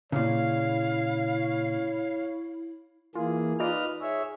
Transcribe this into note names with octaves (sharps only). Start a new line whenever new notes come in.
A#2 C#3 E4 C#5 F5
E3 A#3 F4 G#4
D#4 F4 B4 D5 D#5 F6
G#4 C#5 E5